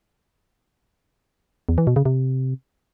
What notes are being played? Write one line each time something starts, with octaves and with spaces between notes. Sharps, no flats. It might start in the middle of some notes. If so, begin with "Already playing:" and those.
E2
E3
B2
C#3
C3